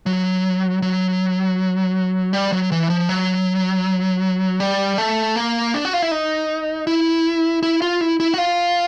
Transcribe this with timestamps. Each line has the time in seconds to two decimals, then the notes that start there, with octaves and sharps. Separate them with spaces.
0.06 F#3
0.82 F#3
2.33 G3
2.52 F#3
2.72 E3
2.90 F3
3.09 F#3
4.60 G3
4.98 A3
5.36 A#3
5.74 D4
5.85 F#4
5.93 F4
6.02 E4
6.11 D#4
6.87 E4
7.63 E4
7.82 F4
8.01 E4
8.20 E4
8.34 F#4
8.38 F4